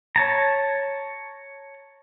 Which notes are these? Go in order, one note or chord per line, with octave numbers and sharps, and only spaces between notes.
C#5 A5 A#5